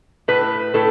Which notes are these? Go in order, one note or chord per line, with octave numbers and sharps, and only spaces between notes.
A2 B4
A2 A4